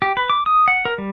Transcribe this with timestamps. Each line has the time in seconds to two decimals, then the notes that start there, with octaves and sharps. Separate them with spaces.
0.02 G4
0.17 B4
0.30 D6
0.46 D#6
0.68 F#5
0.85 A#4
0.98 G3